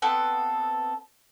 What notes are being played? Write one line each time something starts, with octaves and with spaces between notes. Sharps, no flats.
B3 C4 A4